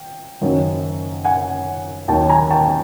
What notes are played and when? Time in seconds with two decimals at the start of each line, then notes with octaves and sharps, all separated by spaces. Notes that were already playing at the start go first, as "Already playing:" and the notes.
Already playing: G5
0.41 F#1 F#2 D#3 F#3
1.24 F#5 G#5
2.08 D#2 D#3 F#3 G5 A5
2.29 G#5 A#5
2.51 G5 A5